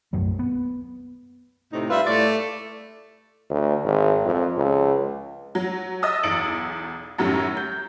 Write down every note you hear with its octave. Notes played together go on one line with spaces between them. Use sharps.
B1 F#2 F#3 A3
B3
A2 C3 D#4
G3 F4 B4 E5
A2 A3 D5
D2
G#1
F2
C#2
F#3
D#5 E5 D#6 E6 A6
B1 E2 A6 C#7 D7 F#7
F#2 A2 D#3 F#3 G3 C#4
G6